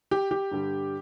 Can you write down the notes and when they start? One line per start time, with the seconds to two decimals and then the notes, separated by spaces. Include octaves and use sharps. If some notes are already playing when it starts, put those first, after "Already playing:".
0.11 G4
0.31 G4
0.51 G2 D3 G3